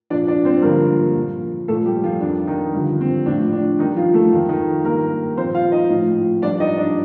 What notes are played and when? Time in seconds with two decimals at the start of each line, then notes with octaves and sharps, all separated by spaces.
0.10 A#2 F3 D4 D5
0.28 D4 D5
0.45 C4 C5
0.62 G2 D3 F3 A#3 A#4
1.15 A#2 F3
1.68 A#2 F3 A3 A4
1.86 G3 G4
2.04 F3 F4
2.21 F2 D#3 D4
2.47 D#3 D#4
2.73 G2 D3 F3
3.01 C4
3.26 A2 F3 D4
3.53 D4
3.79 G2 D#3 D#4
3.96 F3 F4
4.14 A3 A4
4.31 F2 D#3 F3 F4
4.49 D#3 D#4
4.84 G2 D#3 A#3 A#4
5.37 A#2 F3 C4 C5
5.55 F4 F5
5.72 D#4 D#5
5.90 A2 F3
6.42 G2 F3 D4 D5
6.60 D#4 D#5
6.78 D4 D5